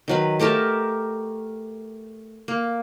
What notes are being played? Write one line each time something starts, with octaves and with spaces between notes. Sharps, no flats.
D#3 F#3 B4
A3 G4 A#4 A5
A#3